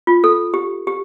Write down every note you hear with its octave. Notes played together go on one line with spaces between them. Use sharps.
F4
A4
G4
G4